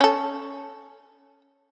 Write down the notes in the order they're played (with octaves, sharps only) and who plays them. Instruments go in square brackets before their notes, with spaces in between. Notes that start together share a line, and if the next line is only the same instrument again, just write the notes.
[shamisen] C#4 A4